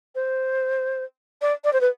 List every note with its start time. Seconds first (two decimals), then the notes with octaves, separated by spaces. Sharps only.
0.15 C5
1.42 D5
1.64 D5
1.73 C5
1.81 B4